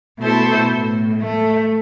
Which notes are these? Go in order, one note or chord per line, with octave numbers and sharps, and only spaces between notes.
B2 A3 E4 A4 C5
A2
A3